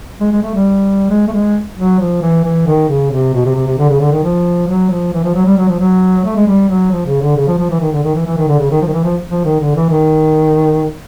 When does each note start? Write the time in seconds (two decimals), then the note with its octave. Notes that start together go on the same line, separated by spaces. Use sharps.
0.20 G#3
0.32 G#3
0.43 A3
0.54 G3
1.10 G#3
1.28 A3
1.33 G#3
1.77 F#3
2.00 F3
2.22 E3
2.44 E3
2.67 D#3
2.89 C#3
3.11 C3
3.34 B2
3.45 C3
3.56 C3
3.67 C3
3.79 D3
3.90 C#3
4.01 D3
4.12 D#3
4.23 F3
4.68 F#3
4.91 F3
5.13 E3
5.24 F3
5.35 F#3
5.46 G3
5.57 F#3
5.69 F3
5.80 F#3
6.24 A3
6.36 G#3
6.47 G3
6.69 F#3
6.92 F3
7.06 C#3
7.21 D3
7.36 C#3
7.48 F3
7.59 F3
7.70 E3
7.81 D#3
7.92 D3
8.04 D#3
8.15 E3
8.26 E3
8.37 D#3
8.48 D3
8.59 C#3
8.71 D#3
8.82 F3
8.87 D#3
8.93 E3
9.04 F3
9.30 F3
9.45 D#3
9.60 D3
9.75 E3
9.90 D#3